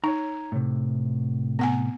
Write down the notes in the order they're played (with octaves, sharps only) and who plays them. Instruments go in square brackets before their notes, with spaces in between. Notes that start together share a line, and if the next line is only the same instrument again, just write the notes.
[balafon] D#4 [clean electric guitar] C#5 A#5
[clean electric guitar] A2 C3
[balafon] B3 F#5 G#5